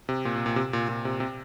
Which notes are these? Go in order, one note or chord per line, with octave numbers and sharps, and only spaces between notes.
C3
A#2
A#2
A#2
C3
A#2
A#2
C3
C3